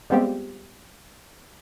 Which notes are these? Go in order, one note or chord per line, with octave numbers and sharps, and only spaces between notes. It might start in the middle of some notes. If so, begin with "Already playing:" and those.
G3 G#3 B3 C4 F4 G4